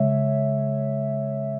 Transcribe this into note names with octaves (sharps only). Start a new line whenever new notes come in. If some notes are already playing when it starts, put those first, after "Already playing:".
Already playing: C#3 G#3 C#5 E5